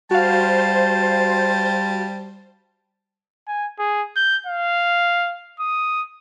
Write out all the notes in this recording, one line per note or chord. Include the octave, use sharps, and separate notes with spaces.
G3 F#4 C5 F5 A5
G#5
G#4
G6
F5
D#6